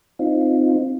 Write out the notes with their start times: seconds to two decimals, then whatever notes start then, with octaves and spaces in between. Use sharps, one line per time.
0.19 C4 D#4 F4